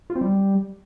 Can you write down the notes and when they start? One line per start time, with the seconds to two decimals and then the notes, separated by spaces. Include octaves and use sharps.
0.10 F4
0.15 C4
0.21 G3